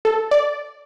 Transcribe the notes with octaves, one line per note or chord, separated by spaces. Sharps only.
A4
D5